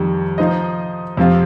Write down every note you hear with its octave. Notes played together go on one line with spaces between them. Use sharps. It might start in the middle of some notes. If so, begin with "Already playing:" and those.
Already playing: F2 D#3 G3
F3 D#4 C5 D#5
F2 C3 F3 C4 F4